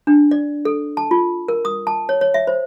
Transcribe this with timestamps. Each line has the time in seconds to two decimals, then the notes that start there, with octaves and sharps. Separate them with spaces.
0.07 D4
0.31 D5
0.65 A4
0.97 A5
1.11 F4
1.48 A#4
1.65 D#6
1.87 A5
2.09 C#5
2.21 C#5
2.34 E5
2.47 C5